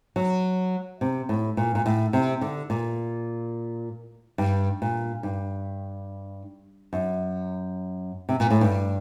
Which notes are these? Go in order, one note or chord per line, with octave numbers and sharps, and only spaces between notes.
F#3
C3
A2
A#2
A#2
A2
C3
D3
A#2
G2
A#2
G2
F#2
C3
A#2
A2
G2